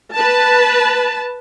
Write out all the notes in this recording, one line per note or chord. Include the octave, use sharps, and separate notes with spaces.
B4 A5